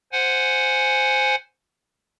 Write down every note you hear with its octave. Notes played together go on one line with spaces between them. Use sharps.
C5 F#5 G#5